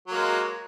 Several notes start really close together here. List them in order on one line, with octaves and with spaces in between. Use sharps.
F#3 A#3 G#3